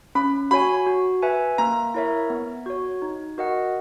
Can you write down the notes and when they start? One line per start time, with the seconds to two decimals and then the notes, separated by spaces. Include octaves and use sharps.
0.15 C#4 B5
0.51 F#4 C#5 G#5 B5
0.87 F#4
1.23 B4 E5 G#5
1.58 A#3 A#5
1.94 E4 A#4 C#5 E5
2.30 B3
2.66 F#4 C#5
3.02 D#4
3.38 F#4 A#4 D#5 F#5